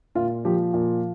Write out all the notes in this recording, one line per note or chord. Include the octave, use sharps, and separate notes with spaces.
A#2 F4
F3 G4
A#2